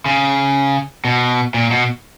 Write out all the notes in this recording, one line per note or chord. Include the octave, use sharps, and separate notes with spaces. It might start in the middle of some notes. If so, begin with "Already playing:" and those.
C#3
B2
A#2
B2